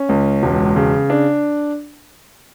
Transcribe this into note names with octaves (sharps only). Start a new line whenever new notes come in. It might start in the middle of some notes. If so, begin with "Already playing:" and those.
Already playing: C#4
C#2
E1
C#3
D4